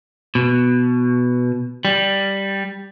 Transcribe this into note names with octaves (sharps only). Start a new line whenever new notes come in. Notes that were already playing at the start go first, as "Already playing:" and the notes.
B2
G3